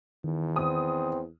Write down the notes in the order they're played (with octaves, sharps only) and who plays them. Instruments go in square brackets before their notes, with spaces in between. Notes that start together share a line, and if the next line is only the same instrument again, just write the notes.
[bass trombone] E2 [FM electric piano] D#3
[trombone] C4 [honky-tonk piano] D#6